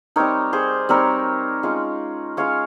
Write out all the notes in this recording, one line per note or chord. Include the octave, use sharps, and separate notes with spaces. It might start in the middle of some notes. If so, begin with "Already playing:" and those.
G3 C4 D#4 A#4 C#5
G#4 C5
G3 C4 D#4 A#4 C#5
G#3 C#4 F4
G#3 C#4 F4 C#5 F5